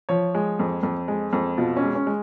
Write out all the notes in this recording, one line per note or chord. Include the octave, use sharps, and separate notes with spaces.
F3 C#5
G#3
F2
F2
G#3
F2
B2 F4
C#4
G#3
C#4
G#3